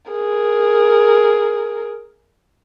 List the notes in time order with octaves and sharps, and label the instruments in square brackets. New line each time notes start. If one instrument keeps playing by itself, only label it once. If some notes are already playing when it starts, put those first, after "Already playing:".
[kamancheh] G#4 A#4